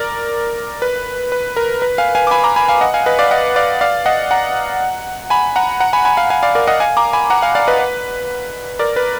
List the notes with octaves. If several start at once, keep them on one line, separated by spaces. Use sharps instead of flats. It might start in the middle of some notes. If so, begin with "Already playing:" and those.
Already playing: A#4 D5
B4
B4
A#4
B4
F5 G#5
F5 G#5
D6
G#5 B5
A#5 D6
G#5 B5
F5 G#5
D#5 F#5
F5 G#5
B4 D#5
D5 F5
D#5 F#5
D5 F5
D5 F5
D#5 F#5
F#5 A#5
G#5 B5
F#5 A#5
F#5 A#5
G#5 B5
G#5 B5
F5 G#5
F5 G#5
D5 F5
A#4 D5
D#5 F#5
F5 G#5
A#5 D6
G#5 B5
F#5 A#5
F5 G#5
D5 F5
B4 D#5
B4
A#4 D5
B4